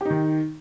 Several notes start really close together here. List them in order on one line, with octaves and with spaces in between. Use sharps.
G4 D#4 D#3